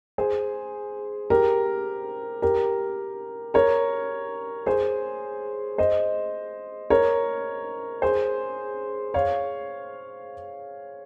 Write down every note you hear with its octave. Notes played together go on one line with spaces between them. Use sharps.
G#4 C5
G4 A#4
G4 A#4
A#4 C#5
G#4 C5
C5 D#5
A#4 C#5
G#4 C5
C#5 F5